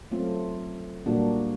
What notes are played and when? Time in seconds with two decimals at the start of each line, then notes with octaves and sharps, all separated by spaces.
0.11 F#3 A3 C4 F4
1.06 A#2 G3 A#3 D4 F#4